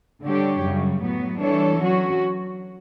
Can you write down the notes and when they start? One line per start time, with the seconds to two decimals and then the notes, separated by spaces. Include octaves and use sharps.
0.23 D3 G3 D4 G4 C#5
0.62 F#2 C#3 G3
1.01 A2 F#3 B3
1.39 E3 G3 D4 A4 C#5
1.78 F#3 C#4 F#4